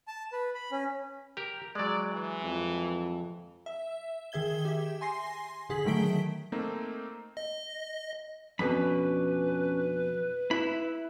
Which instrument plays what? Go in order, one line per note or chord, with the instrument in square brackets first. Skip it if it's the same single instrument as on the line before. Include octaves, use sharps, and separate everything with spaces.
[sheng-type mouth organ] A5
B4
B5
C#4
[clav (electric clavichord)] G4 A#4
[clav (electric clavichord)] F#3 G#3 [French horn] D5
[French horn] E3
[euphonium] F2
[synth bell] E5
D#3 G#4 E5 G#6 G7
G4 E5
G#5 C6 A#6 C7
D3 G#4 B6 F#7
D#3 F#3 A3 B6 D7 G7
[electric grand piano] A3 A#3 C4 D#4
[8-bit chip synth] D#5
[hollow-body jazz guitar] F2 B2 [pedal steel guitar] C#4 D4 B5 [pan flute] B4
[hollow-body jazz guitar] E4 [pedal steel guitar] E5 B5